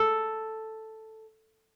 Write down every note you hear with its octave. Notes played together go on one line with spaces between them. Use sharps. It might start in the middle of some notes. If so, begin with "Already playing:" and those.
Already playing: A4